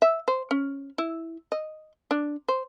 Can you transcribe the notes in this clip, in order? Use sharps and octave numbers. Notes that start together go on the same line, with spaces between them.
E5
C5
C#4
E4
D#5
D4
C5